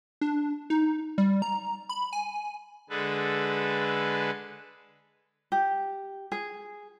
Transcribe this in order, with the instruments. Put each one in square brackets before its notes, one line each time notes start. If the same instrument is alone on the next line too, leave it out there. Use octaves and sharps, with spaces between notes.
[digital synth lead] D4
D#4
G3
A#5
B5
G#5
[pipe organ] D3 G#3 G#4 A4 B4
[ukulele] G4
G#4